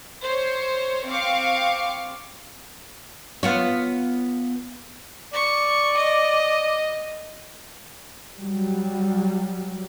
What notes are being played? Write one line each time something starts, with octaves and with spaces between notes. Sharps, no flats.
C5 C#5
C4 F5 C#6 D6
B3 F4 C#5
D5 C#6
D#5
F#3 G3